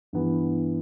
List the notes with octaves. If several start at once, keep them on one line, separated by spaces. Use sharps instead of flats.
G2 E3 B3